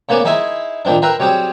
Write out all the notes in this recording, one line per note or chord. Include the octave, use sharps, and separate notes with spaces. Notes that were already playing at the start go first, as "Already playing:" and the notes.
C#3 A#3 B3 C5 D5 G#5
D#4 E4 G#4 E5 G#5 C6
A#2 D#3 F3 C4 D4
A#4 B4 E5 G5 A#5 C6
F#3 G3 C4 G#4 C5